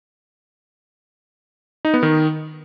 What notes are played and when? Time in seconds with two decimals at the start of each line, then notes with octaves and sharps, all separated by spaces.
1.85 D#4
1.94 B3
2.03 D#3